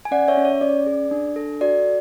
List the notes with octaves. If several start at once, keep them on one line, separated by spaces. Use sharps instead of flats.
G#5
C#4 D5 F#5
C#5 E5
C#4
C#5
C#4 D5
G#4
D4
A4
F#4 D5